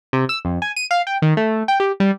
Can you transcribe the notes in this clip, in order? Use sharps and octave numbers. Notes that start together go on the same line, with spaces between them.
C3
E6
F2
G#5
D#7
F5
G5
D#3
A3
G5
G4
G3